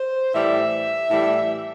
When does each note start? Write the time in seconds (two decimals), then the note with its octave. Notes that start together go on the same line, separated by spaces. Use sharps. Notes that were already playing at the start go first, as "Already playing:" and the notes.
Already playing: C5
0.33 A2 E3 G3 E5
1.08 A2 E3 G3